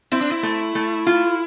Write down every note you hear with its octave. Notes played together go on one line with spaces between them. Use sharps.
C4 E4
D4
E4
A3
A3
F4